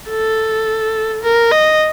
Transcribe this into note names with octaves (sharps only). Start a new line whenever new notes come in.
A4
A#4
D#5